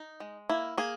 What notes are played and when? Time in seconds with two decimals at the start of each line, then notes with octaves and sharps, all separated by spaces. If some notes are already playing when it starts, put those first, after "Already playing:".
Already playing: D#4
0.20 G#3
0.49 A#3 E4
0.78 A#3 G#4